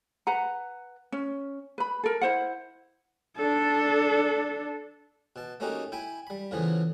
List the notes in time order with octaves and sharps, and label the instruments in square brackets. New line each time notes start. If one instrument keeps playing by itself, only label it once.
[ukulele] B4 F#5 A#5
C#4
B4 B5
A4 A#4
E4 C5 F#5
[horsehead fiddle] D4 A4
[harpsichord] B2 A5
A3 A#3 C#4 D#4 F#4 G4
E4 G5 G#5 B5
G3 B5
E2 A2 C#3 E3 F3 B3